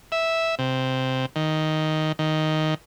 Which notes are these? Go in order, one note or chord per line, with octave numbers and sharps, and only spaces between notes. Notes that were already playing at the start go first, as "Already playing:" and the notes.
E5
C3
D#3
D#3